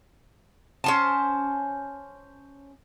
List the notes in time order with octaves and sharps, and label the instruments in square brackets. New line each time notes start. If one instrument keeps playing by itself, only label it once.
[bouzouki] C#4 C5 A5